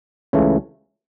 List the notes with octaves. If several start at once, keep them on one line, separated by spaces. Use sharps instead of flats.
C#2 C#3 E3 A3